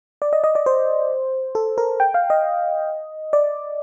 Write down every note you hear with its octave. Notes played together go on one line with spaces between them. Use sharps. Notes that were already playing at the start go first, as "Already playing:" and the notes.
D5
D#5
D#5
D5
C5
A4
A#4
G5
F5
D#5
D5